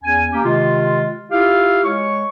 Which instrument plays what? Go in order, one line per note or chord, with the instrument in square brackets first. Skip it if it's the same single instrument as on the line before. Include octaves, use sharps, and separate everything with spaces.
[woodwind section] E2 C#4 G#5
A#3 C#4 G4
C3 D#3 G#3 F4
E4 F4 G4 F5
G#3 C#5 C#6